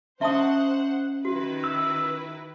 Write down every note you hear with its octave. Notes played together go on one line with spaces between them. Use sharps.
C#4 C5 D#5 E5 F#5 A5 C6 D#6
D#3 E4 F#4 B4
E6